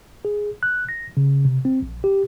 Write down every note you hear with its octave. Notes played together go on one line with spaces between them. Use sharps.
G#4
F#6
A#6
C#3
C3
C4
A#1
G4